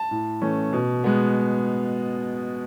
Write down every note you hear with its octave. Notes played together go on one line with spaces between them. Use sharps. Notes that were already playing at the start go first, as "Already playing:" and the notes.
Already playing: A5
A2
E3 A3 C#4
B2
G#3 B3